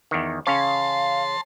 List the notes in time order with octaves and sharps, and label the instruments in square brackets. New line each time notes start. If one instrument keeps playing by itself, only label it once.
[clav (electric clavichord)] E2 D#3
[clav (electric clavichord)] C#3 C#4 C#5 [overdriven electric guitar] F5 [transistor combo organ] A5 C6